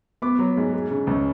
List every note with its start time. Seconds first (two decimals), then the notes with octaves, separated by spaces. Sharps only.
0.22 B3 D6
0.39 F#3
0.57 G#2
0.73 G#3
0.91 C#3
1.07 C#2